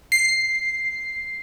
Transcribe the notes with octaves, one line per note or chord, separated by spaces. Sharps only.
C7